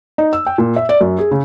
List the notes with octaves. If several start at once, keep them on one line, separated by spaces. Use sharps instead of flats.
D#4
E6
G5
A#2
E5
D5
F#2
G#4
C#3